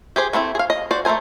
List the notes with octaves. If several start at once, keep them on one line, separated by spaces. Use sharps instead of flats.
G4 G#4 C5
A3 B3 C4 E4
G#4 F5
D#5
F#4 C5 D5
A3 A4 A#4 C5 G#5